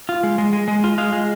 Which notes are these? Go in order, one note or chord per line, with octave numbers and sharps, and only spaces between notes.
F4
G#3
G#3
G#3
G#3
F4
G#3 F5
G#3